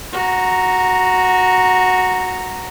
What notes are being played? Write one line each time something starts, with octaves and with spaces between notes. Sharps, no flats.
F#4 A#5